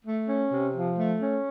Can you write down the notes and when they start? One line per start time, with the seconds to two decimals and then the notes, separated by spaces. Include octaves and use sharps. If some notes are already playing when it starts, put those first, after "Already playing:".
0.05 A3
0.28 C#4
0.51 C3
0.74 F3
0.96 A3
1.19 C#4